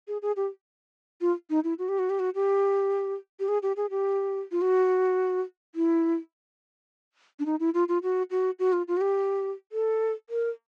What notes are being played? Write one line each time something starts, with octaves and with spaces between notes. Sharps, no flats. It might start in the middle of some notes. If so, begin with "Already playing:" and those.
G#4
G#4
G4
F4
D#4
E4
F#4
G4
F#4
G4
F#4
G4
G4
G#4
G4
G#4
G4
F4
F#4
E4
D4
D#4
E4
F4
F4
F#4
F#4
F#4
F4
F4
F#4
G4
A4
A#4